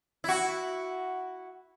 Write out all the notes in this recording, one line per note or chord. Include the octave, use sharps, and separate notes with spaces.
E4 F#4